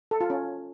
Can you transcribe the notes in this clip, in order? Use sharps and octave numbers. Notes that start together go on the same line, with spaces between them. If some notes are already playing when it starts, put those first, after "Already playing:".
A4
F4
C#4